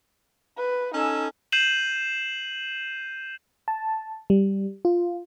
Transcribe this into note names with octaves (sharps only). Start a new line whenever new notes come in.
B4
C#4 D#4 A4 G#5 E6
G6 C7 D#7 E7 F#7
A5
G3
F4